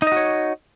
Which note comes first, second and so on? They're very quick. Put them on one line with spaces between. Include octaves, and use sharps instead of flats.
D#4 D#5 F#4 C#5